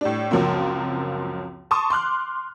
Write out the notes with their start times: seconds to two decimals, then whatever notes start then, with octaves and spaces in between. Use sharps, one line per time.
0.01 A2 G3 D4
0.31 C#2 F#2 F3 F#3 A#3 C4
1.71 A5 C6 C#6 D#6
1.90 C6 D6 F6 F#6